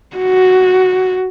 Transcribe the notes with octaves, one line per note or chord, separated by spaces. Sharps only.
F#4